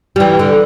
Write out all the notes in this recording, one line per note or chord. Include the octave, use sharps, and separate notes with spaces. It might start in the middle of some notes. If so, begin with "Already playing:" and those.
G3
E3
D3